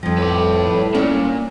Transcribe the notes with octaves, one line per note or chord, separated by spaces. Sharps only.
F2 F3 G3
A2 B4 D5
A#2 C#4 D4